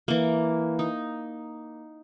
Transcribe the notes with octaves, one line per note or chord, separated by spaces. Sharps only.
E3 A#3
D#4